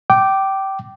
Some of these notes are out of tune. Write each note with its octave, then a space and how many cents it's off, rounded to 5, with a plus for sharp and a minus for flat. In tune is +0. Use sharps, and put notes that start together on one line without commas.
G5 -20 D6 +0